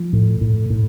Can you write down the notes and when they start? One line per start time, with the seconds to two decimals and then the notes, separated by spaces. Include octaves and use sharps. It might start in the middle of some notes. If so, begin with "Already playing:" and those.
Already playing: F3
0.13 A2
0.41 A2
0.70 A2